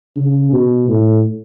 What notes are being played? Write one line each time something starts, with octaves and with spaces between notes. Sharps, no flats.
C#3
B2
A2